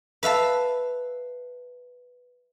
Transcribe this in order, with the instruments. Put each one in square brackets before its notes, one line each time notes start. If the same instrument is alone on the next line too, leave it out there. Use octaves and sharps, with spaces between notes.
[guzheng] B4 E5 F5 A5